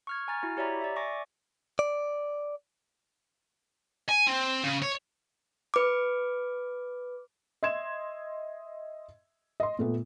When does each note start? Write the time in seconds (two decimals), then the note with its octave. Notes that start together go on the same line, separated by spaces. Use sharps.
0.07 C#6 F6 G#6
0.28 G#5 A#5 F6 A6
0.43 E4 F#4
0.57 G4 C#5 D5 E5 A#5 B5
0.81 D5 E5
0.96 D5 E5 G#5 C#6 D6 A#6
1.79 D5
4.09 G#5
4.27 C4
4.64 C#3
4.82 C#5
5.74 B4 D6
7.63 D#5 E5 C6 G#6 E7
9.60 D#5 C6
9.79 A#2 A3 B3